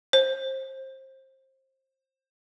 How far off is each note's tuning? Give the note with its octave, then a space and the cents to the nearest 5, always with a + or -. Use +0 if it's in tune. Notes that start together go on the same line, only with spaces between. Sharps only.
C5 +25